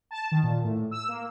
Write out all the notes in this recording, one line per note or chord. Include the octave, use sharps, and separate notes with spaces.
A5
D#3
A#2
A2
E6
A#3